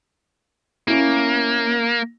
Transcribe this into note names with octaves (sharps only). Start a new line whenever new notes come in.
A#3 C#4 E4